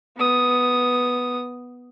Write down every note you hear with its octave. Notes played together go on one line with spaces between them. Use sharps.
B3 D#6